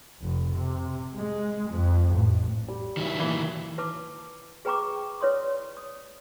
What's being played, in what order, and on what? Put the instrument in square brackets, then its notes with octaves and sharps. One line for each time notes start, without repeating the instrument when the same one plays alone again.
[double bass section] F1
C3
G#3
F2
A1
[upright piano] G3
[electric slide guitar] D#3 F#3 E4
[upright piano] A#2 E3 G7
[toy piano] E4 B4 A5 D6
G#4 B4 G5 A#5 C#6 D6
E4 B4 C#5 D5 C6 D#6
D#6